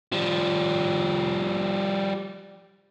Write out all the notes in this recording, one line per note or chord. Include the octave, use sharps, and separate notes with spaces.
F3 G3